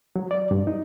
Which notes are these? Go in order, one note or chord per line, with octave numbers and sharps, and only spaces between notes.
F#3
D5
G2
D#4